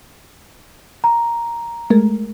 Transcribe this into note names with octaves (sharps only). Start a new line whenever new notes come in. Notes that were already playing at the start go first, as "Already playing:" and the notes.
A#5
G#3 A3 A#4